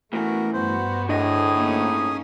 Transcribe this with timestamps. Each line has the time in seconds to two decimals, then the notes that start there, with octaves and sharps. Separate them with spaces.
0.13 A2 E3 A3 B3 F#4 A#4
0.53 G2 B3 F#4 C5
1.09 D2 A2 D4 G#4 D#5 D#6
1.52 A#3 C#4 D#4